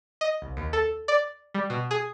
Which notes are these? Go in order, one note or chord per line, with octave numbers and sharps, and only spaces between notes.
D#5
C2
D#2
A4
D5
G3
B2
G#4